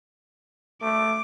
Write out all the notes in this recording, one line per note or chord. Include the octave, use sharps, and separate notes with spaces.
A3 D6